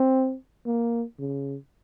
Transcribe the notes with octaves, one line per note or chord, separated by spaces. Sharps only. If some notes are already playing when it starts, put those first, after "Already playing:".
Already playing: C4
A#3
C#3